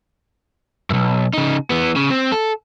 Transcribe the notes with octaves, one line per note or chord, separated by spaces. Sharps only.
B1 F#2
C#3 D#4
E3 B3
C#3
C4
A4